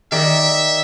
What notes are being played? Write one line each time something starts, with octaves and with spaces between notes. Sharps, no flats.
D#3 D5 E5